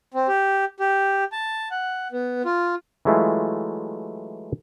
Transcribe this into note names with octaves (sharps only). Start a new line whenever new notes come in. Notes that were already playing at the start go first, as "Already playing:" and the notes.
C4
G4
G4
A5
F#5
B3
F4
E3 F#3 G#3 A3 E4 F4